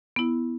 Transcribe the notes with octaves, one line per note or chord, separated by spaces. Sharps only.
B3 E4